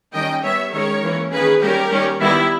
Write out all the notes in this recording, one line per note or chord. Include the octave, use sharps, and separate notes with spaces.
D#3 G3 A#3 C#4 D#5 G5
G3 B3 C#5 E5
D#3 G#3 C#4 A#4 C#5
E3 A#3 C#4
D#3 A#3 C#4 G#4 B4
G3 A#3 C#4 G4 A#4
D#3 G3 C#4
D#3 G3 B3 E4